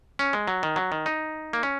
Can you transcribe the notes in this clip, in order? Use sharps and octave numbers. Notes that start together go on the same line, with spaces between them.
C#4
G#3
F#3
D#3
F#3
D#3
D#4
A#3
C#4